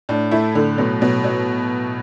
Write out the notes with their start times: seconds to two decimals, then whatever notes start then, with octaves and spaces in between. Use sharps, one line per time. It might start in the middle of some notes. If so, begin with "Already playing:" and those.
0.09 A2 D4
0.31 A3 E4
0.55 A2 D3
0.78 B2 F#3
1.01 B2 F#3
1.24 F#3